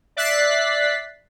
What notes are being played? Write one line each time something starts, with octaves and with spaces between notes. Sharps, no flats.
D5 E5 F#6 A6 B6 C7